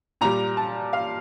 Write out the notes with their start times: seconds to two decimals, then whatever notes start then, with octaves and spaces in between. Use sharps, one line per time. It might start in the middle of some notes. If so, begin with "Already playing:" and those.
0.21 A#2 G3 A#5
0.57 A5
0.93 F5